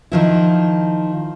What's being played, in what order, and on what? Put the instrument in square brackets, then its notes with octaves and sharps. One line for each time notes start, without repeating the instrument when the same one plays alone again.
[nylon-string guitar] D#3 F3 E4